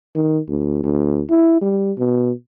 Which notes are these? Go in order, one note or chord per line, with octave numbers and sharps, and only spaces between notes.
D#3
D2
D2
E4
G3
B2